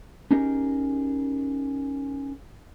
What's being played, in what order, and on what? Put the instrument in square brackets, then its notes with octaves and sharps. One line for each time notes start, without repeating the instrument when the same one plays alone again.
[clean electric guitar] C#4 D#4 G4 G#4 A#4 D#5